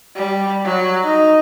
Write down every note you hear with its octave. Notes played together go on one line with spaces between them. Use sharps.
G3
F#3
D#4